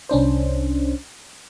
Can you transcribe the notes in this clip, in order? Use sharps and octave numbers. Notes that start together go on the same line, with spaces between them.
C2 C#4 D4 C5